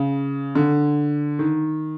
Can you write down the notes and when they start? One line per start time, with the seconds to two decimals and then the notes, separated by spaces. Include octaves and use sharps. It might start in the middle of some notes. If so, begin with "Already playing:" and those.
Already playing: C#3
0.55 D3
1.39 D#3